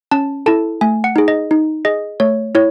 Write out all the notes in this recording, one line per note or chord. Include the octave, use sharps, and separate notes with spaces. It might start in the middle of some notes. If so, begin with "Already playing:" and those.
C#4 A5
E4 A4 A5
A3 G#5
F#5
D#4 G#4
D#5
D#4
G#4 D#5
A3 C#5
E4 C#5